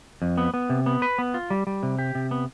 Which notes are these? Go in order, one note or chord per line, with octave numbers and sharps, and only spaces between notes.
F2
B3
B3
C3
B3
B4
B3
F4
G3
G3
C3
G4
C3
B3